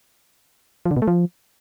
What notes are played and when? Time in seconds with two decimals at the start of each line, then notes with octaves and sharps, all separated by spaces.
0.86 F3
0.91 D3
0.97 B2
1.02 A3
1.08 F3